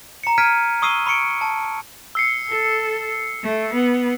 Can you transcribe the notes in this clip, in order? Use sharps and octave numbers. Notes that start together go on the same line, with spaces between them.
A#5 C#7
F6 G#6 B6 D7 D#7
C#6 D#6 E6 C7 D#7 G7
B5 C#6 C#7 D7
A5
E6 C7 C#7
A4
A3
B3